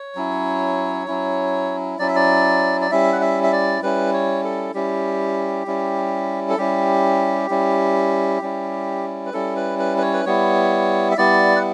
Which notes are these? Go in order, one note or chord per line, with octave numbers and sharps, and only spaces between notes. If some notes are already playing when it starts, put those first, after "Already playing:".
Already playing: C#5
F#3 C#4 E4
F#3 C#4 E4
F#3 C#4 E4 D5
E5
D5
D5
G3 C#4 E4 E5
F#5
E5
E5
D5
G3 C#4 E4 B4
C#5
A4
G3 C#4 E4 G4
G3 C#4 E4
A4
G3 C#4 E4 G4
G3 C#4 E4
G3 C#4 E4
B4
G3 C#4 E4 A4
B4
B4
B4
C#5
B4
G3 B3 E4 C#5
E5
G3 B3 E4 D5
F#5